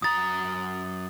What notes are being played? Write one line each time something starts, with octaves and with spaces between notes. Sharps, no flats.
F#2 F#3 A#5 D#6 A6